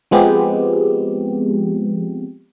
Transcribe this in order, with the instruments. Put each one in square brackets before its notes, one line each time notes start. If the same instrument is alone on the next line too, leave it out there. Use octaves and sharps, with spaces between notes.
[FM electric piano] F3 G#3 B3 C4 G4